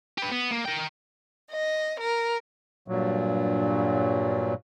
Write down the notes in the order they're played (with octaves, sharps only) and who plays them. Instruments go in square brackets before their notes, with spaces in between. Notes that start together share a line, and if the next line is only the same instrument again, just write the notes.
[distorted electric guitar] G4 B4
B3
A#3
A#4 G5
[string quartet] D#5
A#4
[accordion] G2 A#2 F#3